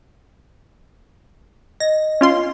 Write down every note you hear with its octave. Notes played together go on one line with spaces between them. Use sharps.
D#5 A#6
C#4 F4 C6